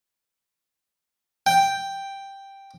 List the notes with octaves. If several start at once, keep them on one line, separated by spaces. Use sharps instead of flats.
G5